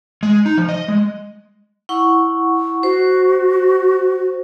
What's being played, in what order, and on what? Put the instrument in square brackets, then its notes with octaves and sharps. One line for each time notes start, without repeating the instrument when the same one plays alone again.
[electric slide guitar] G#3
D#4
F3
D#5
G#3
[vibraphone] E4 F#5 C#6
[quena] F#4 [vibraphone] C5